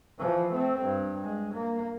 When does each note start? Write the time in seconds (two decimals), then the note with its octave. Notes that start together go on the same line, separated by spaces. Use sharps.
0.19 E3 F3
0.52 A3 C4
0.82 G2
1.23 G#3
1.54 A#3